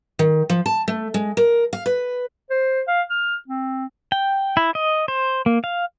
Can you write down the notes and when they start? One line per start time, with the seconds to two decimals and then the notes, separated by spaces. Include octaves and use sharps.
0.19 D#3
0.50 F3
0.66 A5
0.88 A3
1.14 G#3
1.37 A#4
1.73 F5
1.86 B4
2.50 C5
2.88 F5
3.10 F6
3.48 C4
4.12 G5
4.57 E4
4.75 D#5
5.08 C5
5.46 A#3
5.64 F5